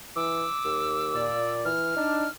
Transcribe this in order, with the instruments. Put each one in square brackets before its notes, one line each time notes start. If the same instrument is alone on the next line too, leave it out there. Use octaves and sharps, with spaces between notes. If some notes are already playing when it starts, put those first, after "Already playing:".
[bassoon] E3 [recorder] D6 [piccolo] E6
[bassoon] D#2
[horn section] A#2 D5
[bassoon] E3 [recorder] F6
[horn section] D4 [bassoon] D#4